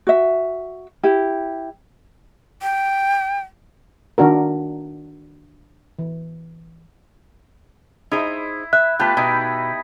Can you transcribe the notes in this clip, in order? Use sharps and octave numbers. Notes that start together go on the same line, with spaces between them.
F#4 E5
E4 G4
G5
D#3 D4 F#4 A#4
E3
D#4 E4 G#4 C5
E5 F#6
A3 B3 F4 G4 B4 A5
B2 D#4 E4